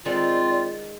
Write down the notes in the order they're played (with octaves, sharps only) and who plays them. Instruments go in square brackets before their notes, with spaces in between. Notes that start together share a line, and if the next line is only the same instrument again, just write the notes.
[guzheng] D#3 G#3 [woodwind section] C4 F4 [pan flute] D5